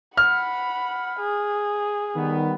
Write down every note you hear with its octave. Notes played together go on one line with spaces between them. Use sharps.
F#5 B5 F6
G#4
D#3 G3 B3